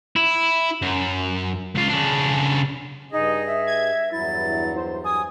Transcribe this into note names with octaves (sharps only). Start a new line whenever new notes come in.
E4
F#2
C#2 F4
C#3 D4
G2 D#4 G#4 D#5
E5
G#6
E2 G2 F#3 E4 A6
C5
G#5 D#6